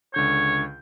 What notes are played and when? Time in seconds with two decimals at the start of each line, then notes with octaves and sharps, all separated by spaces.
0.14 C#2 D3 C#5 G6